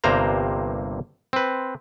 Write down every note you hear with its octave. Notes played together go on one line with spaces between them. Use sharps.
G1 G2 C3 A#3 C5 A#5
C4 B4